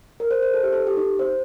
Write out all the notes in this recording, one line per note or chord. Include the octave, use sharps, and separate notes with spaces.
A#4
C5
C5
A4
G4
A4
G4
D#4
C5